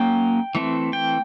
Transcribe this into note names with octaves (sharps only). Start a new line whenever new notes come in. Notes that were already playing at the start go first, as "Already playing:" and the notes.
Already playing: F#3 A#3 C#4 G5
E3 A3 C4
G5